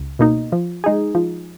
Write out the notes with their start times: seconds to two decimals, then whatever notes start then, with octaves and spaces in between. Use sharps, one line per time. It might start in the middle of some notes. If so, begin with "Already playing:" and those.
Already playing: C#2
0.19 B2 A#3 D#4
0.52 F3
0.84 G#3 D#4 G#4
1.15 F3